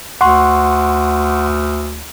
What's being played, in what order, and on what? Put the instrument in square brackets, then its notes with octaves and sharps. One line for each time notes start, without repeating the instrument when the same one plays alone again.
[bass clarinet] D2 [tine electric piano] F#5 C6 C#6